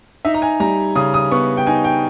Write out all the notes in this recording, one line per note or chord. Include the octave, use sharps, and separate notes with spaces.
D#4 E5
A#5
G#5
G3 A#5
C#3 D#6
D#6
B3 C#6
G5
D#4 G#5
G5